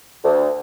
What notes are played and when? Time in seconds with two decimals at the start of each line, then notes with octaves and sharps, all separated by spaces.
0.24 D2